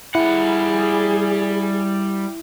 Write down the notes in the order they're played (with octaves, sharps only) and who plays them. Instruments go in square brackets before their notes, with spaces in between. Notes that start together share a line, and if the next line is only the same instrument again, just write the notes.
[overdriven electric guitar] G3 F#5 [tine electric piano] E4 [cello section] G#4